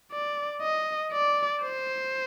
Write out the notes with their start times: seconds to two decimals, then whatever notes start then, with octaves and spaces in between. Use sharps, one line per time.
0.12 D5
0.62 D#5
1.12 D5
1.62 C5